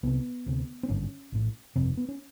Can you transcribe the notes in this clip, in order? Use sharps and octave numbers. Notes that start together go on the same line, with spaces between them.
C2 C3 B3
D2 C3
C4
G#1 G2 D3 C#4
A#1 A2
G1 F2 C3 C4
B3
C#4